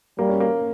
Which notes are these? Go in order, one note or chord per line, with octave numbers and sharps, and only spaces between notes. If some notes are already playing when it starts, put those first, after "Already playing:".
G3 A#3
C#4
A#3